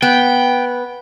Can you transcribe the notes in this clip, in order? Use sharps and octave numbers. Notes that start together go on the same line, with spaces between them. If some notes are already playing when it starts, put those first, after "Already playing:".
B3 G5